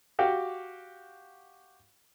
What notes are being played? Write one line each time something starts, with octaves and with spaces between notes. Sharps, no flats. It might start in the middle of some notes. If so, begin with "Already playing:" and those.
F#4 G4 F5 G5